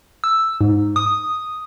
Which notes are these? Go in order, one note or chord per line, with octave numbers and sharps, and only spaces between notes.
E6
G#2
D#6